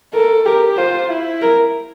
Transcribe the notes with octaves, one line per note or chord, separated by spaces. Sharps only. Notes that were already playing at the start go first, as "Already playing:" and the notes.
A4 A#4
G4 A#4
F4 C5
E4
A#4